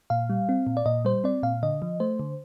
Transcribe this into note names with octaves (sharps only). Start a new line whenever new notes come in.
A#2 F5
G3
C4
A#2
D5
A#2 D#5
G3 C5
C4 D5
A#2 F5
D3 D#5
F3
A3 C5
D3